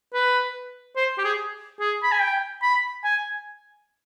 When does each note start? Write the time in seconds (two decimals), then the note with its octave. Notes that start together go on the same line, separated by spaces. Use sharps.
0.14 B4
0.96 C5
1.18 G4
1.24 G#4
1.80 G#4
2.03 B5
2.12 G#5
2.21 G5
2.62 B5
3.04 G#5